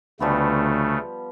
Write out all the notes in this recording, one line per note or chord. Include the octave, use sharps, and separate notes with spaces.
D2 C#3 F3 G3 A3 B3